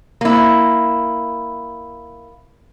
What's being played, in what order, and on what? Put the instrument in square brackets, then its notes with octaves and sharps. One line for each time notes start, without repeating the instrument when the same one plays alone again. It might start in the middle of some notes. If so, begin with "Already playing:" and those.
[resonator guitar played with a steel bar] A#3 E4